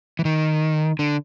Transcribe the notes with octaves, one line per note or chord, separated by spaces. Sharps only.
E3
D#3
D3